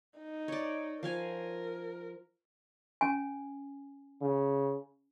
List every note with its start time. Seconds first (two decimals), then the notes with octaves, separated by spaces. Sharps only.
0.18 D#4
0.48 C#5 D5
1.03 F3 A#4 F5 G#5
3.01 C#4 G#5
4.22 C#3